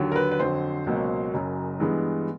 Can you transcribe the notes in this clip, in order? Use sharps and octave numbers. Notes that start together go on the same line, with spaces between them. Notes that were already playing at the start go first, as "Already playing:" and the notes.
Already playing: D#2 D3 F#3
A#4
B4
B4
F2 D3 F#3 C5
C#2 B2 F#3 A#3
F#1 F#2 C#3
G2 E3 G#3 B3